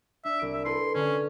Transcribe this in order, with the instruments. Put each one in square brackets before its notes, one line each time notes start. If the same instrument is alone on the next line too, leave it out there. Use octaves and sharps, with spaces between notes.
[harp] D4 [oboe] E5
[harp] C2 D7
[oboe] E5
[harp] E4 A4 B4 [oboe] C6
[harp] D3 [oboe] C#4